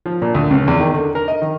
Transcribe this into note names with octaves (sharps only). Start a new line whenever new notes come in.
F3
A#2
D2
C#2
E2
D#3
D3
A#4
D#5
D#3